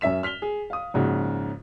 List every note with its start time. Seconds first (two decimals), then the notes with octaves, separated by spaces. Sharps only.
0.01 F#2 C#4 E5 B6 E7
0.23 F6 B6 F7 G7
0.42 G#4
0.70 F5 D#6
0.94 A#1 G#2 C#3 F#4